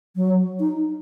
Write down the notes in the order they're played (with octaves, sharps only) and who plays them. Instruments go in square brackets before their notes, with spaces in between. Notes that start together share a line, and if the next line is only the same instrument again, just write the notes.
[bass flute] F#3
D#4